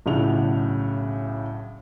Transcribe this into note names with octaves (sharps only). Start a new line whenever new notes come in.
B1 A2 C#3 D4 F#5 F7